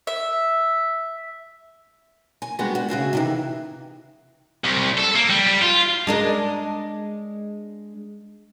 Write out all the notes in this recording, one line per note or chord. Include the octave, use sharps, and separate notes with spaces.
E5
G#5
G3 G#3 B3 D4 F#4 G4
F#4
C#3 F#4 G#4 E5
C3 D#3 E3
C2
A4
A#3
G3
G3
F4
G#3 D4 A#4